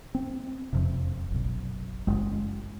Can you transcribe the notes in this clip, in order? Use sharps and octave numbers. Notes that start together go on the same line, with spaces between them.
C4
E1 F2 C3
F#1 B1
F#1 G#3